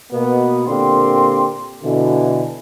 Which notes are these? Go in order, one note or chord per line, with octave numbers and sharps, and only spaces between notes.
B2 A#3 B3
A#2 D3 A#3 C4 G4 C6
B2 D3 E3